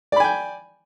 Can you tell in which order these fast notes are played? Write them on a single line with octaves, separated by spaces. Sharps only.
D5 B5 G#5 G5